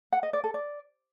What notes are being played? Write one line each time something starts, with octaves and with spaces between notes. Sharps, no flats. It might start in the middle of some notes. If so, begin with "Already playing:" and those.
F#5
D#5
D5
A4
D5